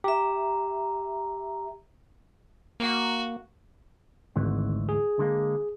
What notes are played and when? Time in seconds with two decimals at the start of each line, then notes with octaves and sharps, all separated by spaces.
0.04 G4 E5 A#5
2.80 A#3 F#4
4.36 G#1 D2 G#2 E3
4.89 G#4
5.19 D3 G#3 A#3